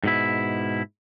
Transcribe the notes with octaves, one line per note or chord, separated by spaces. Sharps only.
G#2 B2 E4